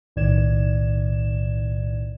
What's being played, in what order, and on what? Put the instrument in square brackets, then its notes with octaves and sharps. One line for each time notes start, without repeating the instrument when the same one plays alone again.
[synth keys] B1 A2 D#3 D5 G#6 E7